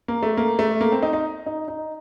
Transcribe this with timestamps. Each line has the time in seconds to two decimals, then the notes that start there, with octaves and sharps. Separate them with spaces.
0.08 A#3
0.23 A3
0.37 A#3
0.59 A3
0.81 A#3
0.92 C4
1.02 D#4
1.13 D#4
1.46 D#4
1.68 D#4